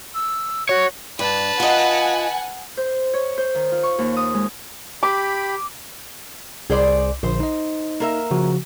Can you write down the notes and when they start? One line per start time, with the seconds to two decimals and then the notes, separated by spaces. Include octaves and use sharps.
0.14 E6
0.69 F#4 C#5
1.19 G2 B4 A5
1.60 F4 D#5 F#5 G#5
2.77 C5
3.14 C#5
3.38 C5
3.55 D#3
3.72 F4
3.83 C#6
3.98 D#2
4.17 D#6
4.34 G#3
5.03 G4 B5 D6
6.70 C2 G#4 C5 D5
7.23 A#1 D3 C5
7.40 D#4 D#5
8.00 A#3 A#4 E5
8.31 C#3 F3 F#4